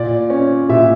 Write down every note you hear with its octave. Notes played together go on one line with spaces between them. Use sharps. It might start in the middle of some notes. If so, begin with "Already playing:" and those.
Already playing: A#2 D5
C#4
A#2 E5